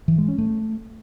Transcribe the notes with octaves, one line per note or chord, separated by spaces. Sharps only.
E3
G#3
C#4
A3